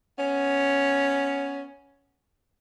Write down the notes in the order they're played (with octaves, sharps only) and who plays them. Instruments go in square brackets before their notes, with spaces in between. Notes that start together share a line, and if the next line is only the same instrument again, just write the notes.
[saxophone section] B3 C#4